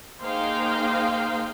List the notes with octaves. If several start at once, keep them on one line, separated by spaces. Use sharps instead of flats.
A#3 D#4 G#4 C5 F5 G5